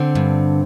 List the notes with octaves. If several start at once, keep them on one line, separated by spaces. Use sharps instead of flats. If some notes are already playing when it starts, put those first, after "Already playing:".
Already playing: D3 C4
G2